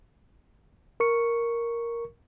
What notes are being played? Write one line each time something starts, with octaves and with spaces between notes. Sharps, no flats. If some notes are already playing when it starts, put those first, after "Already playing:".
A#4 C#6 C#7